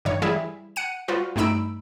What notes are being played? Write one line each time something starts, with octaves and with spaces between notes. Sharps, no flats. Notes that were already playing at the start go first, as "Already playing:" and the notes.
G2 D#3 C#5
E3 G3 E4 G#4 E5
F#5 C#7 D#7
G3 F4 F#4 B4
G2 A3 D#4 B5 E6 D7